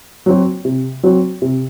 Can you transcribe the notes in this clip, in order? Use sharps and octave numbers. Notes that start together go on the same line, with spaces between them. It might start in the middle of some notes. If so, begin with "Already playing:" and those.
F#3 C4 F#4
C3
F#3 C4 F#4
C3